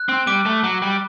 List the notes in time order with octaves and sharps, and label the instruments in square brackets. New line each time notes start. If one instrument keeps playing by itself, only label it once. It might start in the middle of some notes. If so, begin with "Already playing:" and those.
Already playing: [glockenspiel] F#6
[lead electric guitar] C4
[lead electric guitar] G3 [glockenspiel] D6
[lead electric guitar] A3
F#3
G3